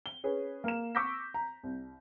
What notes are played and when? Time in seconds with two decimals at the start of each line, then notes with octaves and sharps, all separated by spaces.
0.06 G7
0.24 C#4 G#4 B4
0.64 A#3 E7
0.95 C#6 D6 E6 G6 A#6 B6
1.34 A#5
1.63 C2